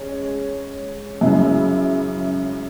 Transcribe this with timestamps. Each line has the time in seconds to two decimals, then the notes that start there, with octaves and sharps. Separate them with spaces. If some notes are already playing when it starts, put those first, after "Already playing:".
Already playing: G#3 C#4
1.21 F#2 C#3 G#3 E4